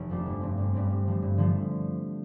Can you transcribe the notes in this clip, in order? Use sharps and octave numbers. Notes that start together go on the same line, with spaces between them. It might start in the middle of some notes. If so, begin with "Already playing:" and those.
Already playing: F1
F2 F3 A3 D4
G1
G2 G3 C4
G1
G2 G3 C4
G2
D3 F3 A3
G2
D3 F3 A3